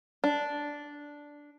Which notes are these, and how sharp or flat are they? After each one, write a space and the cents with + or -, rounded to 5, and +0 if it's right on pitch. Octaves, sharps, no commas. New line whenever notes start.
D4 -5